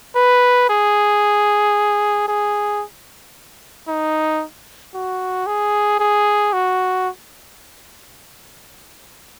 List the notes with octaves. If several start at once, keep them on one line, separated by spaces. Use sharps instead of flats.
B4
G#4
G#4
D#4
F#4
G#4
G#4
F#4